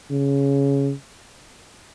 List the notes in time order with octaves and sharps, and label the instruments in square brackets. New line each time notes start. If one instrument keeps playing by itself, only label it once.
[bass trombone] C#3